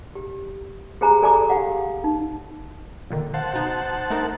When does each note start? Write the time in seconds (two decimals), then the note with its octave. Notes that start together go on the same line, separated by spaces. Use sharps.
0.15 G4
1.01 G4 G#4 C5 G#5 A#5 B5
1.23 A4 D5 G#5 A#5 B5 D6
1.50 G4 F5 F#5
2.04 D#4
3.11 A#2 D3 D#3
3.34 C5 F5 F#5 A5
3.54 B2 D#4
4.10 A3 D#4 A#4